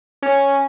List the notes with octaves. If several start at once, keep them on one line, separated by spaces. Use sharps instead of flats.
C#4